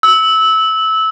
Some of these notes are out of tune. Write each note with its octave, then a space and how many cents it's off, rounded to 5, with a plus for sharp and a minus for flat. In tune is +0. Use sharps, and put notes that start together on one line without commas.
E6 -20